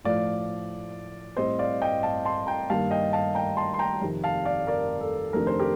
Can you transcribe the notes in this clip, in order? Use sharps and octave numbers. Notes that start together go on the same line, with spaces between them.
A2 F3 A3 D5 F5
A2 G3 C4 C5 D#5
D5 F5
D#5 G5
F5 A5
A5 C6
G5 A#5
G2 D#3 A#3 D4 F5 A5
D#5 G5
F5 A5
G5 A#5
A5 C6
C6
G5 A#5
F2 C3 D#3
F5 A5
D5 F5
A#4 D5
A4
F2 C3 D#3 A3 D4 A#4
C5
G4 A#4